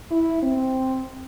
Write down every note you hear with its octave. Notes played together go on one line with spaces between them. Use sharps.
E4
C4